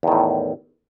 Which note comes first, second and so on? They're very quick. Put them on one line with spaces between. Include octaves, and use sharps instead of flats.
E2 D#3 A2